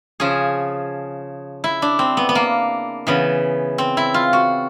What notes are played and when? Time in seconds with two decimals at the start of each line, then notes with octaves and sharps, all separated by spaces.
0.20 C#3 F3 G#4
1.64 E4
1.82 D4
1.99 C4
2.17 B3
2.29 B3
2.35 A#3
3.07 C#3 E3 B3
3.78 C4
3.97 E4
4.14 F4
4.33 F#4